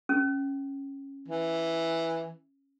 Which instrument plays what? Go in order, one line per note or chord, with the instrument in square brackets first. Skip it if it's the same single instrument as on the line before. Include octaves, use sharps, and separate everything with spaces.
[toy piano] C#4
[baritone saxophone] E3